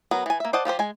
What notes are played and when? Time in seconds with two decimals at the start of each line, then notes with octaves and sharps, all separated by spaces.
0.11 F#3 B3 A#4
0.26 E3 G#5
0.40 A#3 E5
0.53 C5 D5 D#5 F#5 A5
0.65 F3 F4 G4 C5
0.79 G#3 G#5